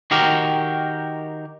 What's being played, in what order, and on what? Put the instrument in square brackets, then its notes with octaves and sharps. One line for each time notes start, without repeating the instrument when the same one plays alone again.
[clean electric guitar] D#3 F#4 G4 A#4